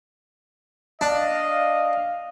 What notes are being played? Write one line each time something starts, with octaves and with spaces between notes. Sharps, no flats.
D4 D#5 F5